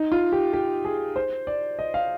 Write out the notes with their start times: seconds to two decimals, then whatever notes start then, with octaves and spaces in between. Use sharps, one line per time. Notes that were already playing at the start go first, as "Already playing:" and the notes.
Already playing: D#4
0.12 F4
0.32 G4
0.53 G4
0.85 G#4
1.16 C5
1.47 D5
1.79 D#5
1.94 F5